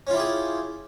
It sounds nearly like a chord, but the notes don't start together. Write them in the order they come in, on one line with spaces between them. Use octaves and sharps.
C#4 F4 E4 G4 G#4